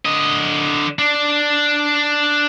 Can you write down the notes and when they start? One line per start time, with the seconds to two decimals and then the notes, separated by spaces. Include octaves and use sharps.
0.06 D3 D#5
0.99 D4